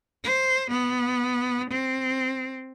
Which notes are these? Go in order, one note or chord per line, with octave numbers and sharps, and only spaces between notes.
C5
B3
C4